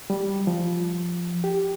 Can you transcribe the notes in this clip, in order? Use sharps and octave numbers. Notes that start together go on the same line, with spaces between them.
G3
F3
G4